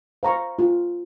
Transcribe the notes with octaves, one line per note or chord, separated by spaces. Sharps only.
C5 F5 A#5 C#6
F4